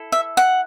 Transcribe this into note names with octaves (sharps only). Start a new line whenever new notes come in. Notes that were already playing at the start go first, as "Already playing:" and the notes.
Already playing: E4 A4
E5
F#5